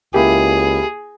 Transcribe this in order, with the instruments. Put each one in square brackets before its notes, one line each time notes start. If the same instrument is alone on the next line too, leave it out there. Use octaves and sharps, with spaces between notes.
[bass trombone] C#2 [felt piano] A#3 E4 [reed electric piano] G4 [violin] G#4